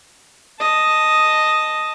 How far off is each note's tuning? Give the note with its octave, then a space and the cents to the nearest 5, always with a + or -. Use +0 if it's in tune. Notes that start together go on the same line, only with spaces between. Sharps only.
D#5 +0 A5 +0